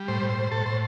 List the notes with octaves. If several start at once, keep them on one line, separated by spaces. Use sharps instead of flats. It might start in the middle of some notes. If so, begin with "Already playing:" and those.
Already playing: G3
A2 C5
A2
C5
A2
A2 A4
A2 C5